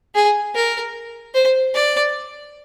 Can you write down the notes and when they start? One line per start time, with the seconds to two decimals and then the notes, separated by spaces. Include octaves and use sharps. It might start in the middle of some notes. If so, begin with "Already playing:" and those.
0.15 G#4
0.55 A#4
1.34 C5
1.75 D5